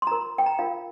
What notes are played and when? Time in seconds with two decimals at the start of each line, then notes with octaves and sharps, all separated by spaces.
0.02 C6
0.07 F4 A#5
0.11 A#4
0.38 G5
0.46 A#5
0.59 F4 A#4 F5